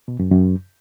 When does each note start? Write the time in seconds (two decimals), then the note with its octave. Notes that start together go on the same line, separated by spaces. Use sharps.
0.08 B2
0.19 F#2
0.31 F#2